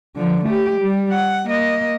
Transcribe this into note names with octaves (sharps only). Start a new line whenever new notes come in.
D3 F3
A3 G4
G3
F#5
A#3 D#5